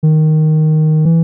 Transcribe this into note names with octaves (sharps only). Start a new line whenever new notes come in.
D#3
E3